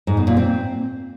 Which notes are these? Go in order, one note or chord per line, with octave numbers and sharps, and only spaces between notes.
G#2
B2
A#2
C4